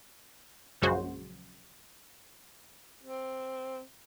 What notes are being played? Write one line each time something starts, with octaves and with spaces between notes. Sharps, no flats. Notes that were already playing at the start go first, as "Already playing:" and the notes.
A#1 F#2 C#3 G#3 F#4 C5
C4